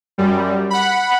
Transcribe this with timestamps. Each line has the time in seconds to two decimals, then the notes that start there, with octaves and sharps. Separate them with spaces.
0.18 F#2 G3
0.70 F#5 B5